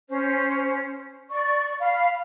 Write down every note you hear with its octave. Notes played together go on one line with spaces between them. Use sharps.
C#4 C5
D5 C#6
F5 B5